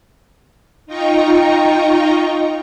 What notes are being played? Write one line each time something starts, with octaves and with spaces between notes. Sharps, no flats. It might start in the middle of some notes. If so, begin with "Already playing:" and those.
D#4 F4 D#5 G5 A#5 C#6